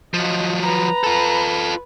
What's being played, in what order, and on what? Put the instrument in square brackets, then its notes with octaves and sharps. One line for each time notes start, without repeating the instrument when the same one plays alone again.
[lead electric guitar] F3 F#3 [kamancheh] F4 D#5
[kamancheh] B4 [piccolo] A#5
[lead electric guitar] F4 A4